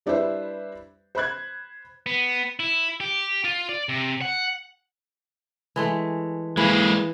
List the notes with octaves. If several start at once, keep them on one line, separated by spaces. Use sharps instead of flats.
G3 D4 E4 B4 C5 E5
C5 B5 F#6 G#6
B3
E4
G4
F4
D5
C3
F#5
E3 G#3 A3
E3 G#3 A#3 B4